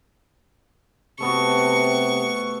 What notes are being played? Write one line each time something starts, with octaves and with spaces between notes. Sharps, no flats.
C3 A3 B3 F#4 C#6